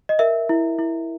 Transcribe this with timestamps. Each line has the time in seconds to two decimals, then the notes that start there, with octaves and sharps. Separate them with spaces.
0.09 D#5
0.19 A#4 E5
0.49 E4
0.79 E4